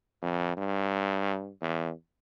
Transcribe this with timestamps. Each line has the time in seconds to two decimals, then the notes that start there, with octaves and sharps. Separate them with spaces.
0.22 F2
0.57 G2
1.61 E2